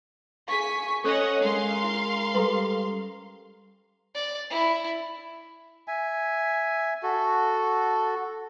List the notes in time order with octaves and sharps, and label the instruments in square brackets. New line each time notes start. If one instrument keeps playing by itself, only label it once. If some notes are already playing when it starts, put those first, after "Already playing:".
[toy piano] G#4 F5 [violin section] G#5 B6 [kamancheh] C#6
[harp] C#4 F#6 [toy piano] A4 [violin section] C#5 D#5 F#5
[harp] G#3 C#4 [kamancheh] A#4 [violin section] F5 C6
[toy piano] E4
[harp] G3 A#5 [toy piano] G4 A4 B4
[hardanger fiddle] D5
E4
[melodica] E5 G#5
F#4 A4